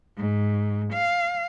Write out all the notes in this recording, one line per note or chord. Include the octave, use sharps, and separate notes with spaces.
G#2
F5